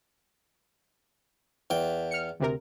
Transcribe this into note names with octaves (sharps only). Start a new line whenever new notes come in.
E2 G5
F6 C#7
D2 C3 A#4